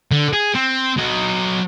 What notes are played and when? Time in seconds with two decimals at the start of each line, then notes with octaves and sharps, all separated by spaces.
0.11 D3
0.33 G#4
0.55 C4
0.98 F#3 D#5